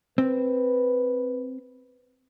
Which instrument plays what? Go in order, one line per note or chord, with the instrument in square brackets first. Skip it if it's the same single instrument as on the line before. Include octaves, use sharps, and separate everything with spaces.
[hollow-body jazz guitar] C4 [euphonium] B4